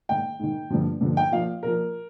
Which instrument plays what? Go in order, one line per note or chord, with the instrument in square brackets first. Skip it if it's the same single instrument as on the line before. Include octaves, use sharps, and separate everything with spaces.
[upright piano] G#2 D#3 G5
G#2 D#3
G2 D3 F3
G2 D3 F3
G5
A#2 F3 F5
A#2 F3 A#4